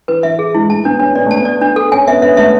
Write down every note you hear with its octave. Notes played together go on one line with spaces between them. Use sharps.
E3 B4
E3 E5
G#4
G#3 E4
A3 A5
B3 D4
C#4 D4
B3 D5
A3 A5
B3
D5
D4
A4
C#4 G#5
B3 E5
B3 E5
A3 E5